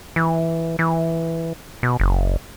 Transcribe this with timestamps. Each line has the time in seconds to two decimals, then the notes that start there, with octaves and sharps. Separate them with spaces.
0.16 E3
0.79 E3
1.83 B2
2.00 F#1